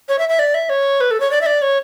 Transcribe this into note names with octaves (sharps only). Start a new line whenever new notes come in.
C#5
E5
E5
D5
E5
C#5
B4
A4
C#5
D5
E5
D5
C#5